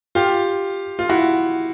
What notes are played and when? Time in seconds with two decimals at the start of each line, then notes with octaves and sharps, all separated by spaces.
0.15 F4 G4
0.99 F4
1.10 E4 F#4